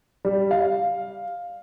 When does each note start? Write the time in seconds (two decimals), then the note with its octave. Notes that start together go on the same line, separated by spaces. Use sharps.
0.25 G3
0.51 F5